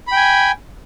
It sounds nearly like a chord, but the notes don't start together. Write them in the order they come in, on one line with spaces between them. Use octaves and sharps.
B5 G5 G#5